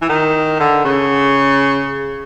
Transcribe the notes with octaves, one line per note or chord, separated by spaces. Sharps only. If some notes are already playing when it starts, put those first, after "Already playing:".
E3
D#3
D3
C#3